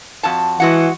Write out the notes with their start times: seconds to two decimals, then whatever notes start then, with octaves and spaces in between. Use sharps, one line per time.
0.23 F2 F#4 A5
0.60 E3 G#3 F#4 F#5